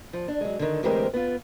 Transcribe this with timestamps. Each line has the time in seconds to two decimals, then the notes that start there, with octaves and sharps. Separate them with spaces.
0.13 F3
0.28 D4
0.41 F#3 G#3
0.59 D3 D#3
0.83 D2 E3 G#3 C4 G4 A#4
1.14 B3 F4